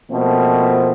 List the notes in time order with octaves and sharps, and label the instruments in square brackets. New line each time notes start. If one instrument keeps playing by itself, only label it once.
[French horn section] B2 F3 A3 A#3 C4